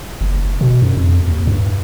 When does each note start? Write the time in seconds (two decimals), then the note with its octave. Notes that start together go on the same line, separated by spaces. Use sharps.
0.21 F#1
0.61 B2
0.82 F#2
0.97 F2
1.28 D#2
1.47 G2